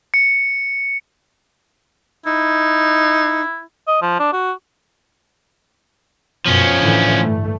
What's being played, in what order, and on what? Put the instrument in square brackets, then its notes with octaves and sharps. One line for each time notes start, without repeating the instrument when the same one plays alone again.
[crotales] C#7
[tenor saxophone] D#4 [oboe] E4
[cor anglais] D#5
F3
D4
F#4
[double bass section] F#2 B2 [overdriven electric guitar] F3 C#4
[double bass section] A2 D3 E3
G2 A3